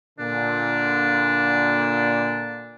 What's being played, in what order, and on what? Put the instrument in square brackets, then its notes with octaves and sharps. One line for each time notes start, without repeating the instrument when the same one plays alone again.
[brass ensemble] A#2 D3 [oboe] D4